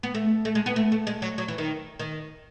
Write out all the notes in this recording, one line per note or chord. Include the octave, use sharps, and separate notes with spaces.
B3
A3
A3
G#3
B3
A3
A3
G#3
F#3
F#3
E3
D#3
D#3